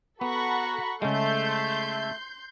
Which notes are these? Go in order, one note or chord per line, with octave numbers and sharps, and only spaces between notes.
B3 F#4 A4 F#5 A#5 B5 C#6
C#3 G#3 A3 C6 G6